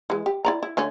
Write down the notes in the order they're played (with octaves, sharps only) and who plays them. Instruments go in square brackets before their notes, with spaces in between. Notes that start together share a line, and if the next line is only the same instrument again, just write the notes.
[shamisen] E3 G#3
G4
E4 D5 A#5
E4
D3 A3 C#4